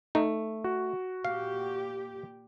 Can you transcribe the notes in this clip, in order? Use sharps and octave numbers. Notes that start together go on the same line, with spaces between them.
A3 D#4
F#4
A#2 G4 F5